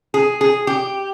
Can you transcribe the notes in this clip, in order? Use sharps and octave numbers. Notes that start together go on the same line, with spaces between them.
G#4
G#4
G4